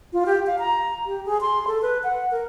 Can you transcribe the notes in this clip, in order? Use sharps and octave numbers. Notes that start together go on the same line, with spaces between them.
F4
G4
F5
A#5
G4
G#4
C6
A4
B4
F#5
A#4